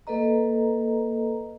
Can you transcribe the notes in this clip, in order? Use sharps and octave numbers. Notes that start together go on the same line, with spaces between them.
A#3 A4 B4 D#5 A#5